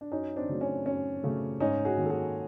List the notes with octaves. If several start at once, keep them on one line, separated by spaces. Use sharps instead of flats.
D4
F#2 C#4 D#4
C4 D4
C#3 F#3 A3
C#4
F#2 C#4
C#3 F#3 A3
G#2 C#4 D#4
F#4 G#4
D#3 F#3 A#3
A4
F#4 G#4